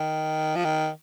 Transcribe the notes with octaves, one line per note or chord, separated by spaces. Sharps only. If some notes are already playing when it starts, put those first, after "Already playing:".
Already playing: D#3
F3
D#3